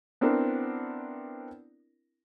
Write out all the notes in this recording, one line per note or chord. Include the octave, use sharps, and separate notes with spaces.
B3 C4 D4 E4 A#4